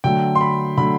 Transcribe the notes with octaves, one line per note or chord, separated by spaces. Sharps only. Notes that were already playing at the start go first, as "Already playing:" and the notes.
D3 F#3 A3 G5
C6
B5
D3 F#3 A3 B5